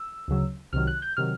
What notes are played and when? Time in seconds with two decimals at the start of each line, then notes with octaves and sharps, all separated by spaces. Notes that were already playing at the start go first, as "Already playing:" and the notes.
Already playing: E6
0.28 D2 C#3 F#3
0.73 C2 C3 D#3 F#3 F6
0.87 F#6
1.02 G6
1.17 C3 D#3 F#3 F6